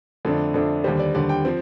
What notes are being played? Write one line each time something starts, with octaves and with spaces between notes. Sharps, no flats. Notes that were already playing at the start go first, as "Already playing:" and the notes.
F2 D3 A3 D4 A4
F2 D3 A3 D4
D#2 D3 G3 C5
D5
D#2 D3 G3 D5
G5
F3 C4